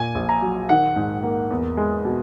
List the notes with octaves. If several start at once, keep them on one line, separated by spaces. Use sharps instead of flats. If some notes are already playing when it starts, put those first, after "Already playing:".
Already playing: A#2 G#5
A#1
A#5
F#3
D#3 F#5
G#2
A#3
E2
G#3
B2